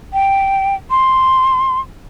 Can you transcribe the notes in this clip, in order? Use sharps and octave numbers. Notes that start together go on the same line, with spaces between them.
G5
C6